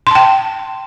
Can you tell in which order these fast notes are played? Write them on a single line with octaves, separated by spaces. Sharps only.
C6 A5 G5